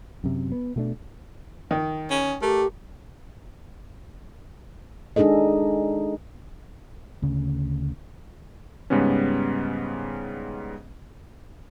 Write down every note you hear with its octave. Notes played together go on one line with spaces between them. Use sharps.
F#2 C3
B3
B2 A3 D4
D#3
C#4
A3 G4 A#4
G#3 D4 D#4 G#4 A4 D#5
D2 C#3
G#2 C#3 G3 B3 C#4